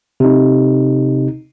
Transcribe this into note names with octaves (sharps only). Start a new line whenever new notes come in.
C3 D#4